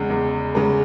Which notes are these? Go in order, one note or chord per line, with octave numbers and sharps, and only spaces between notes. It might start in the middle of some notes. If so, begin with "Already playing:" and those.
Already playing: E2 C#3 G#3
E2
C#3 G#3